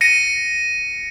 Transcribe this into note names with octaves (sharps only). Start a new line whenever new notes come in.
A#6 C#7 D#7